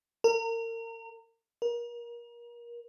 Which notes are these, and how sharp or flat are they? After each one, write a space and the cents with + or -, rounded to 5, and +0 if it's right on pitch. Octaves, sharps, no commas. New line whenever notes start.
A#4 -35
A#4 +30